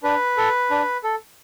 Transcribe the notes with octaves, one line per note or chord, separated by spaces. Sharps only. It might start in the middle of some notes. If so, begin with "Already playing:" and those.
D4 B4
A4
D4
A4